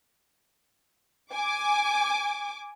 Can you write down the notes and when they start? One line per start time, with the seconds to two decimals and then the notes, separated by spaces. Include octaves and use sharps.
1.32 G#5 D6